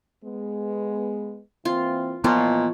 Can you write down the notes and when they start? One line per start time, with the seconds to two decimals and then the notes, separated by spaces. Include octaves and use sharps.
0.24 G#3 B3
1.65 E3 A#3 C4 F4
2.24 A#2 E3 F3 B3 C#5 D#5